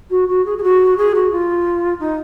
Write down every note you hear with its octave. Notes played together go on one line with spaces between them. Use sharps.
F#4
F#4
G#4
G#4
F#4
G#4
F#4
F4
D#4